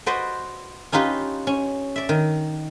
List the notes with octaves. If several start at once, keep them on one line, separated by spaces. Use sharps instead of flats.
F#4 B4 C5 D5 D#5
C#4 D#4 F4 G4 B4
C#4
D5 E5
D#3